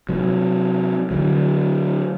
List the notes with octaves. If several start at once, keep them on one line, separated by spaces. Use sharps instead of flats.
C3 F#3
D3 F#3